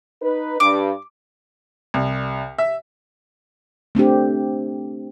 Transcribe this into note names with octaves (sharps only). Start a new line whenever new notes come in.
D#4 B4
G2 D6
C2
E5
A3 C4 D4 G4